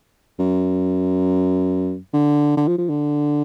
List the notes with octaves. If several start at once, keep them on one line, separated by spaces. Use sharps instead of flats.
F#2
D3
D3
F3
F3
D3